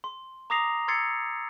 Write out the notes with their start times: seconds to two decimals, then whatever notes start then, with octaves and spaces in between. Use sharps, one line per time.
0.04 C6
0.50 A#5 D6 D#6 A#6 C7 F7
0.88 C6 E6 G#6 A6 C7 C#7